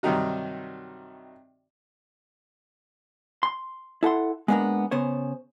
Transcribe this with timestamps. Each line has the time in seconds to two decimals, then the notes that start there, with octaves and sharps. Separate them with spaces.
0.03 G2 C3 D#3 F#3 D#4 F#4
3.43 C6
4.03 E4 A4 F#5 C6
4.48 G#3 A#3 B3 C#4 D4 A#4
4.91 C#3 B3 C5 C#5